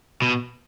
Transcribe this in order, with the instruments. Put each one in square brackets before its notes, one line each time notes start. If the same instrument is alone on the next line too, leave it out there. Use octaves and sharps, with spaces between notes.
[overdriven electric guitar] B2